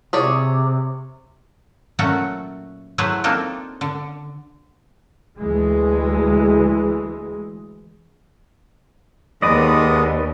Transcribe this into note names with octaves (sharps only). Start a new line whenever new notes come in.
C3 G#4 C#5 D5
A#2 F#3 A3 C#4 F#4 F#5
F#3 A3 E4 G#4 B4 C5
A#3 C4 D4 D#4 F4 A4
D3
D2 E3 G#3
D#2 G#3 B3 B4 D5 D#5 D#6